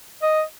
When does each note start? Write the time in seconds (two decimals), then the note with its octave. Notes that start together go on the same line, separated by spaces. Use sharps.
0.22 D#5